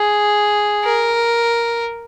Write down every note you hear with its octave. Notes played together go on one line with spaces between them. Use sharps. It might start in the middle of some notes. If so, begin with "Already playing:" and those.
Already playing: G#4
A#4